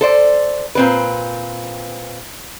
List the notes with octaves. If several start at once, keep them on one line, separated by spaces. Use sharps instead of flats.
A4 C5 D5
A#2 C4 B4